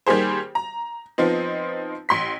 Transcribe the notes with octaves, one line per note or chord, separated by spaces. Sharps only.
D#3 G3 A#3 G4 G#4 C5
A#5
F3 B3 C4 D#4
A1 C6 B6